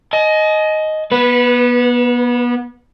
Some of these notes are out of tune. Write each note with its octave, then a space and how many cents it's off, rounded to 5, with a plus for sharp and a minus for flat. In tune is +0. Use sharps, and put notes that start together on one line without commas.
D#5 +0 G#5 +45
B3 -30 B4 +0